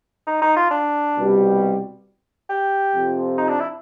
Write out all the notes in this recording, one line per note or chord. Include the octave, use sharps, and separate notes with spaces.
D#4
D#4
F4
D4
C2 B2 G3
G4
F2 C3 F3
D#4
D4
E4